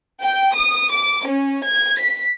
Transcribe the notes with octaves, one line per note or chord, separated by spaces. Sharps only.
G5
D#6
D6
C#4
G#6
B6